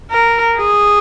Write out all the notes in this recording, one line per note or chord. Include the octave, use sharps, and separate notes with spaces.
A#4
G#4